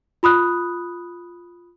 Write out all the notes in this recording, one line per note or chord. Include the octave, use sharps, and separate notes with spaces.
F4 B5 D#6 F#6